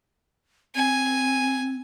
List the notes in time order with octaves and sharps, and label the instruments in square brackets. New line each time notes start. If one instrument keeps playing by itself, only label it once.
[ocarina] C4 [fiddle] G#5